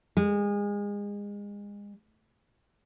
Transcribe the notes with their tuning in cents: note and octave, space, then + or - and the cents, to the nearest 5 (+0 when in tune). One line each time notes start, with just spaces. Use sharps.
G#3 -30